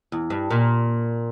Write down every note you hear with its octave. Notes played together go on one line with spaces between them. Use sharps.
E2
G2
A#2